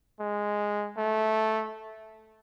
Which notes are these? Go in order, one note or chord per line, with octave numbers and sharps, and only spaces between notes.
G#3
A3